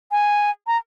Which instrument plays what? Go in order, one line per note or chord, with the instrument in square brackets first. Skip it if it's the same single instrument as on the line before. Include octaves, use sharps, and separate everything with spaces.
[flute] G#5
A#5